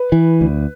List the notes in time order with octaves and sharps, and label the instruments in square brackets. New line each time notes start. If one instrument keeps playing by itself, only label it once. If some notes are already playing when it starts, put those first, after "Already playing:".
Already playing: [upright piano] B4
[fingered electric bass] E3
D2